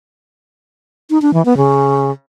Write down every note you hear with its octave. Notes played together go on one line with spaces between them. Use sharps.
D#4
D4
E3
B3
C#3